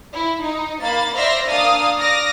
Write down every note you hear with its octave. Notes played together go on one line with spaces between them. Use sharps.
E4
D#4
A#3 B5 A6
C5 D5 E5 C6 F6 A#6
A#3 D4 F5 D#6 F6 A6
D5 D6 D#6 F6 A#6